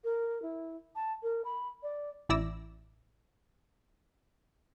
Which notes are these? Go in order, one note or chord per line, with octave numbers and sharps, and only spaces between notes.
A#4
E4
A5
A#4
B5
D5
A1 E4 D5 E6 A#6